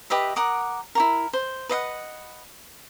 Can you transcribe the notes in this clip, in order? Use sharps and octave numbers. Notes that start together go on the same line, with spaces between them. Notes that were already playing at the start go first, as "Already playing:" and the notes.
G4 B4 D#5 E5
A#4 F#5 D6 D#6
E4 F#4 A#4
C5
B4 D#5 F5 F#5